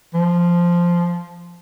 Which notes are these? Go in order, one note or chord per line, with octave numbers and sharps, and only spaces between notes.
F3